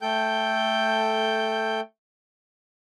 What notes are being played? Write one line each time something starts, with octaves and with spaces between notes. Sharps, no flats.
A3 A4 G5 G6